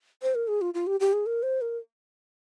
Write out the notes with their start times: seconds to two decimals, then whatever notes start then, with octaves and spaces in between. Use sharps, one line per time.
0.23 C5
0.35 A#4
0.48 G#4
0.61 F4
0.74 F4
0.87 G4
1.00 G4
1.13 G#4
1.26 A#4
1.43 C5
1.61 A#4